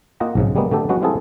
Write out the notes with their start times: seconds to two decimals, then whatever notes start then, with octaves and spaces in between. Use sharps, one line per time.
0.20 A#3 F4 D#5 F#5 G5 A#5
0.35 B1 G#2 C#3
0.55 C#3 G3 G#3 A#3 B3
0.71 D3 A3 D4 G4 A4
0.89 F#3 G#3 B3 C#4 F#4
1.02 G3 C4 E4 F4 G#4 A4